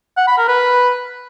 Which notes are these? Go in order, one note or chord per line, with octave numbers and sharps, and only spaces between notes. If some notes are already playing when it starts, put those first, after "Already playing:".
F#5
B5
A#4
B4